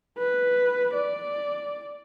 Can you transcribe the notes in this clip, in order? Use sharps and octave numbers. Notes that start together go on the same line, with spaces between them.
B4
D5